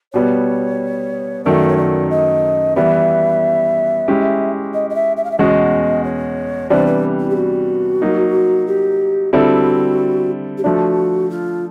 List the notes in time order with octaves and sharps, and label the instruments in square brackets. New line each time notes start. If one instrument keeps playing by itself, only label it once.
[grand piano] B2 G3 B3 [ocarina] C#5
[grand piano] F#2 D#3 F#3 A3 [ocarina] D5
[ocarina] C#5
D5
D#5
[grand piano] E3 G3 B3 [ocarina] E5
[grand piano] G#3 C#4 E4 G4
[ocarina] D#5
D#5
E5
E5
F5
E5
[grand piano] E2 B2 G#3 C#4 F#4 [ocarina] D#5
[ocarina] C#5
[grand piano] C3 E3 G3 B3 D4 [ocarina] C5
[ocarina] B4
E4
G4
F#4
[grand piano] F#3 A#3 D#4
[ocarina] G4
[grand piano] D3 G3 C4 E4 A4 [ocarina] F#4
[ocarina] G4
[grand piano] F3 A3 D4 [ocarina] F#4
[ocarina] F4